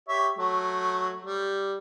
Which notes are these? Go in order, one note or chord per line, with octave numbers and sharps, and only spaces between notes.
G4 C#5 E5
F#3 A3
G3